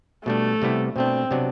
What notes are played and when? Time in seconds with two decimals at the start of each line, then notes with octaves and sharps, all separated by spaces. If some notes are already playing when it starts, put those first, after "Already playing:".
0.26 B2 G3 A3 D4
0.62 C3 G3 B3 E4
0.96 B2 A3 C4 D4
1.31 C3 F#3 B3 D4